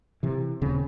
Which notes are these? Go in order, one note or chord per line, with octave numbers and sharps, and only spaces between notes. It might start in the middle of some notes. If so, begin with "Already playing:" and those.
C3 E3
D#1 C#3 C4